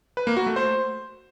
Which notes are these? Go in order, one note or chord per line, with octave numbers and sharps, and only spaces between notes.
B4
A#3
F#4
A3
C5